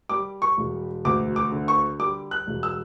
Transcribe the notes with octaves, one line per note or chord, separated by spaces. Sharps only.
G3 D6
C#6
E1
D2 D6
D6
D3
C#6
G3 D6
F#6
E1
E6